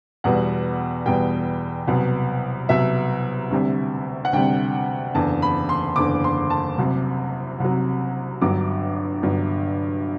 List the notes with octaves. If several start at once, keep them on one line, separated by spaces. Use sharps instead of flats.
E2 B2 G3 F#5
E2 B2 G3 G5
C2 B2 F#3
C2 B2 F#3 E5
D2 C3 G3
F#5
D2 C3 G3 G5
F#1 E2 D3 A5
B5
C6
F#1 E2 D3 D6
C6
A5
C2 C3 F#3
C2 C3 F#3
G1 G2 F#3 D6
G1 G2 F#3